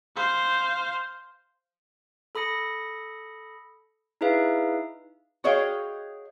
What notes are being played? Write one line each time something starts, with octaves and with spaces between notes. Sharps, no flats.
C5 F5
A4 B5 D#6 A#6 C#7
D#4 E4 G#4 B4 E5 F5
F#4 G#4 C#5 D#5 F5 G5